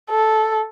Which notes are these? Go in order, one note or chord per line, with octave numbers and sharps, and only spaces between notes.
A4